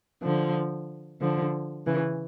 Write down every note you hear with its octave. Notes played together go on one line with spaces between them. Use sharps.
D3 F3
D3 F3
C#3 E3